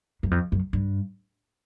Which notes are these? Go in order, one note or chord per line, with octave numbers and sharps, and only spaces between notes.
F#2
F2
F#2
G2